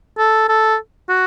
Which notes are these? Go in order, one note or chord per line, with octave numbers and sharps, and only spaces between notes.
A4
A4
F#4